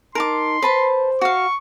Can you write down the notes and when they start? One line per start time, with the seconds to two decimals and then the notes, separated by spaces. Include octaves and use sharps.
0.15 D#4 A#4 A5 C6 D6
0.62 B4 C5 A5 B5
1.21 F#4 F5 C#6